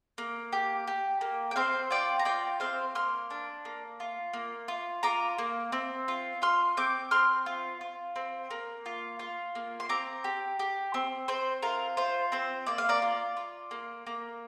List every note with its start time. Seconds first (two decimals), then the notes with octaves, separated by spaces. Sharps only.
0.18 A#3
0.53 G4
0.87 G4
1.21 A#3
1.51 G5
1.56 C4 C5 F5
1.91 F4 D5 G5
2.19 A#5
2.25 F4 D5 G5
2.60 C4 C5 F5
2.95 A#3 C6 F6
3.31 D4
3.65 A#3
4.00 F4
4.33 A#3
4.68 F4
5.03 F4 A#5 D6
5.38 A#3
5.72 C4
6.08 F4
6.42 F4 C6 F6
6.77 C4 D6 G6
7.11 C4 C6 F6
7.46 F4
7.81 F4
8.16 C4
8.50 A#3
8.86 F4
9.19 F4
9.55 A#3
9.80 C6
9.89 C4 A#5 D6
10.24 G4
10.59 G4
10.94 C4
11.28 C4 C5
11.63 F4 A#4
11.97 F4 C5
12.32 C4 C5
12.67 A#3 D5
12.78 F5
12.89 A#4 D5
13.02 F4
13.37 F4
13.71 A#3
14.07 A#3